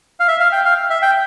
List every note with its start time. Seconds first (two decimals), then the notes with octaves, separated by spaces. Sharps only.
0.20 F5
0.28 E5
0.40 F5
0.52 G5
0.65 F5
0.90 E5
1.02 G5